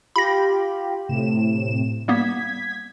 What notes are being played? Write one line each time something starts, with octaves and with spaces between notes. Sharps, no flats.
F4 G4 B5 A#6
A2 C3 E7
G3 A#3 B3 G#6 B6